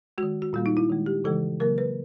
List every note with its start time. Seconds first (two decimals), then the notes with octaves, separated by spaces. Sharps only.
0.18 G#3 F#4
0.23 D#3
0.42 F#4
0.53 A#2 G3 A#3 F4
0.66 D#4
0.77 E4
0.90 D#3 G#3
1.06 G4
1.24 C#3 E3 G#3 A4
1.60 C#3 F#3 A#3 A#4
1.78 B4